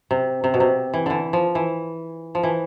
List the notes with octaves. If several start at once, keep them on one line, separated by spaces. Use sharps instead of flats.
C3
C3
B2
C3
E3
D3 E3
F3
E3
F3
E3